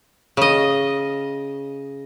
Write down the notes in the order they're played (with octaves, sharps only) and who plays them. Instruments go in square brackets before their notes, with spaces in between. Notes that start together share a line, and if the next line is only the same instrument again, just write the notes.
[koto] C#3 D#5